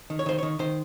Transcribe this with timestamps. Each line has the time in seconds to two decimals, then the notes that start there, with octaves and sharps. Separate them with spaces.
0.10 D#3
0.19 C#5
0.26 D#3 C5
0.38 D#3 C#5
0.59 D#3 C5